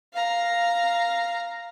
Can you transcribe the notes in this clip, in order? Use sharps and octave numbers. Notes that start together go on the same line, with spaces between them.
F5 A#5